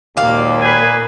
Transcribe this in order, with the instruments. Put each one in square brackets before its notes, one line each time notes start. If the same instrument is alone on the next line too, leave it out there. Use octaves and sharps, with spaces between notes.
[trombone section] G#1 D#2 [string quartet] A#2 A#3 [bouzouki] D5 F5
[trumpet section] G#4 B4 G#5